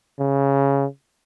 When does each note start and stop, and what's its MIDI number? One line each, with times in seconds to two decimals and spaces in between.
0.19 0.86 49